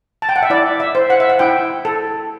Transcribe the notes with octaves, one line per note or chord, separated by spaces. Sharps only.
A5
G5
F#5
E5
E4 D5
E5
C5
F#5
E5
F#5
E4 G5
A4